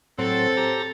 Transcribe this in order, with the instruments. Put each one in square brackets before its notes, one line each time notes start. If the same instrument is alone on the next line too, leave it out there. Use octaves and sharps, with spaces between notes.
[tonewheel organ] A2 F#3 [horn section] C4 [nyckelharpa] A4 A5
[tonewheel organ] G4 A#5